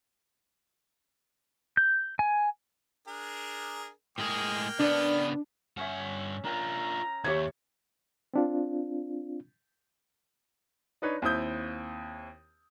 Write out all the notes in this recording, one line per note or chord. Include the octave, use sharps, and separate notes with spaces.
G6
G#5
D4 G#4 A#4
A2 G#3 A#3 G#4 G5 F6
C#3 B3 D4 B4 D5
G2 C#4 C#5 E5 F#5
D4 F4 A#4 G5 A#5
D#2 G4 C#5 D5 E5 C#6 G#6
C4 D4 F4
D4 D#4 B4 C#5
D#2 C4 E4 D#6 G6